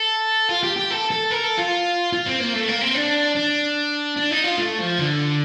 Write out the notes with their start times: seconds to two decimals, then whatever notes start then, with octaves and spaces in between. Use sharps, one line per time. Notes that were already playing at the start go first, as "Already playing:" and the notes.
Already playing: A4
0.49 F4
0.63 G4
0.76 G4
0.91 A4
1.11 A4
1.31 A#4
1.44 A4
1.58 F4
2.13 F4
2.26 C4
2.40 A#3
2.53 A3
2.68 A#3
2.81 C4
2.95 D4
3.36 D4
4.17 D4
4.31 D#4
4.44 F4
4.58 A3
4.79 F3
4.99 D3